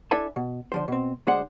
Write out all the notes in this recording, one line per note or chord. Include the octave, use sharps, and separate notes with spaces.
D4 E4 A4 E5 G#5 A5
B2
D3 F3 C5
B2 C4
D2 G#3 D4 C5 F#5